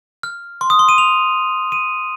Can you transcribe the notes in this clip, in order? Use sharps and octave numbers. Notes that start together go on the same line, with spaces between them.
F6
C6
D#6
C6
D#7
F7
D#7